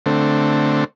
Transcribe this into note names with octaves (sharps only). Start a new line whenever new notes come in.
D3 A3 C4